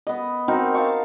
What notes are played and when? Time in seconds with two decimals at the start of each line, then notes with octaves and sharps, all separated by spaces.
0.07 B3 D#5
0.48 C4 D#4 F#4 A#4
0.74 F5 A5 C#6